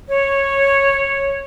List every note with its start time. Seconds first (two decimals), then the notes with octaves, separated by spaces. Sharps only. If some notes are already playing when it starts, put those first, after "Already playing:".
0.08 C#5